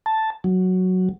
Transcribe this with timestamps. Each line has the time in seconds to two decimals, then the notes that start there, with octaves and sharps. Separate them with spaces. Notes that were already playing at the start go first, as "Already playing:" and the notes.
0.06 A5
0.44 F#3